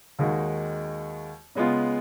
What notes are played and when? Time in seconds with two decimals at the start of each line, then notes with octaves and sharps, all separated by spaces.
0.19 D#2 D#3 G#3 D#4 F#4
1.55 C#3 G#3 B3 F4